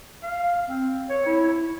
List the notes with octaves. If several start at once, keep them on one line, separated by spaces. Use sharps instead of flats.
F5
C4
C#5
E4